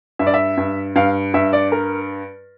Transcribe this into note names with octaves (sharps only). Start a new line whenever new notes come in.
G2 E5
D5
E5
G2
G2 F5
G2 E5
D5
A#4